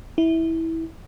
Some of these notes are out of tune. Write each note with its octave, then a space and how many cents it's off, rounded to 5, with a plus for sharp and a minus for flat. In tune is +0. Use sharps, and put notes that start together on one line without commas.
E4 -15